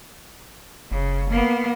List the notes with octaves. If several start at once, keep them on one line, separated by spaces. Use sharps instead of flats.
F#1 C#3
A#3 B3